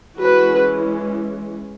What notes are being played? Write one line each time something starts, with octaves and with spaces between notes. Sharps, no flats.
E3 G#3 C#4 F#4 B4